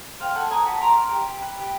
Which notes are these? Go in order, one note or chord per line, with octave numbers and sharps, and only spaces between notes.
C5 F5 G5
A4 F#5 G#5
D#5 G#5 A#5
F#4 A5 B5
D5 A#5 C6
A#4
G4
G4
B4
G4